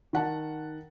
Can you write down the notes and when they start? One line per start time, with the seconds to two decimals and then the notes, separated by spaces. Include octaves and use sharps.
0.13 D#3 F#5 A5